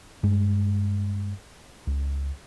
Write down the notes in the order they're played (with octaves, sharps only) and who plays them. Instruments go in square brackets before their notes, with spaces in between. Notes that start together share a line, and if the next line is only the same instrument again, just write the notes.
[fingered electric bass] G2 G#3
C#2